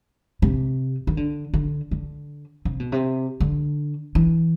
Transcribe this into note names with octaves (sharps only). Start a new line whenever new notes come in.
C3
D#3
D3
D3
D3
C3
B2
C3
D3
E3